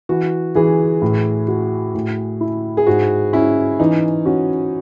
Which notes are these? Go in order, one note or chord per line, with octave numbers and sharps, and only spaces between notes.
E3 F#4
E3 G#4
A2
F#4
A2
E4
G#4
G#2 F#4
C#4 E4
E3 D#4
C#4 F#4